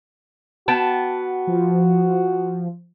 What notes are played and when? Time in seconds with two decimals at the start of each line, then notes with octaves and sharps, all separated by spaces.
0.68 B3 F#4 G5 A5
1.47 F3